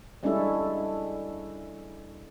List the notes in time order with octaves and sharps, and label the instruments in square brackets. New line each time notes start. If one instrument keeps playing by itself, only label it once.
[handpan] G3 G#3 C#4 D4 E4 A4